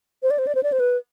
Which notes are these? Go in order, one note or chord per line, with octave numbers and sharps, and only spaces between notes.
C5
D5
C5
D5
C5
D5
C5
B4